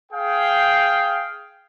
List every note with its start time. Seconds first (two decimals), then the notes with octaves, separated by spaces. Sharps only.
0.11 G#4 F5 G5